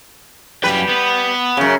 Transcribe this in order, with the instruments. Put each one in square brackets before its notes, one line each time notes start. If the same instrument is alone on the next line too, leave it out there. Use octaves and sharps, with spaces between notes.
[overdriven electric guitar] F#2 G5 [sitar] G3 B4
[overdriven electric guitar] B3
[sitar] F#2 C#3